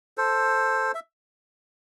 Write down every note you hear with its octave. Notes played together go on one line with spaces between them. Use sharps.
A4 C5
E5